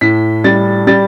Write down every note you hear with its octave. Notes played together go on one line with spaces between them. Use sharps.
A2 B6
G3 A6
G3 A6